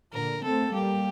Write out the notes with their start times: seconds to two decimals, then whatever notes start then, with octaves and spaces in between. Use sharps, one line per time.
0.13 A#2 D3 A#4
0.44 A3 C4 A4
0.74 G3 A#3 G4